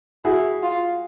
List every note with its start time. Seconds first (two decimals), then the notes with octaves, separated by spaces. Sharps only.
0.25 E4 F#4 G#4
0.63 F4